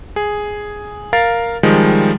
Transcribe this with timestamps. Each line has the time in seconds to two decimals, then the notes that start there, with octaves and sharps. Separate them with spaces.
0.16 G#4
1.13 A#4 F5 A6
1.63 D#3 F3 G3 G#3